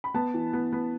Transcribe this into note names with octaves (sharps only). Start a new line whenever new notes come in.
B5
B3 A5
E3
B3
B3